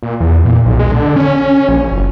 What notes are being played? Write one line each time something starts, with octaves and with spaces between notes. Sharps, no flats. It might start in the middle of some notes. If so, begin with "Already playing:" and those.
A#2
E2
A#2
B1
G#3
D3
C#4
A#1
F#1